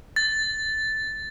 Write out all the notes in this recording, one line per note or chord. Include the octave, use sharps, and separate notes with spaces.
A6